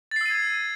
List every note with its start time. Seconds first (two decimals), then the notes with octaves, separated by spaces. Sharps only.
0.11 A6
0.16 C7
0.21 E6
0.26 D#7
0.30 G#6